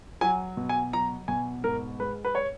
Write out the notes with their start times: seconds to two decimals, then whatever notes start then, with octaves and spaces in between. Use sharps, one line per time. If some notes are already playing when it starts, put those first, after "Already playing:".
0.21 F#3 G#5
0.57 B2
0.69 G#5
0.93 F#3 A#5
1.28 B2 G#5
1.64 G#2 A#4
1.99 G#3 B4
2.25 B4
2.35 C#5